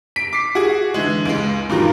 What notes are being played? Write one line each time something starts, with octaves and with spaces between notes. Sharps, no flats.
B6 D7
D6 C7
F#4 G#4
D3 E3 G#3
C#2 G#3
G2 A#2 D#3 F#3